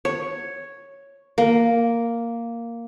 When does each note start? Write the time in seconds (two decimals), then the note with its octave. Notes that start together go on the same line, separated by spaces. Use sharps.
0.05 C#5
1.38 A#3